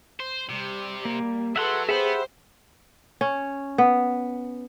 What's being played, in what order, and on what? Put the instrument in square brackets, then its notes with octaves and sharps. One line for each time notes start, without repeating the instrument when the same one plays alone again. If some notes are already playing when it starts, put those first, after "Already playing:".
[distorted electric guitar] C5
[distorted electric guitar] C3 [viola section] G3
[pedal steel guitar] A#3
[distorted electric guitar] F#3 [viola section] G#4 A4 B4 [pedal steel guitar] E5 F#5 C6
[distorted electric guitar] B3 [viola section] G4 C5 [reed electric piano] G#4 [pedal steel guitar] E5 F#5 B5
[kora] C#4
B3